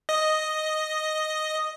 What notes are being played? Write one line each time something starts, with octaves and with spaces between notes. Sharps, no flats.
D#5